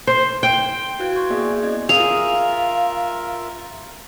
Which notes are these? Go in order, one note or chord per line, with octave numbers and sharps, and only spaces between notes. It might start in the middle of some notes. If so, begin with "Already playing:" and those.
C5
G5
E4 F#4 B4 F5 F#6 G#6
C6 C#6 G6 G#6
A#3 B3 G#4 D5 E5 G#5
C#4 E4 D5 D#5 G#6
F4 G#4 A#4 E5 F5 F7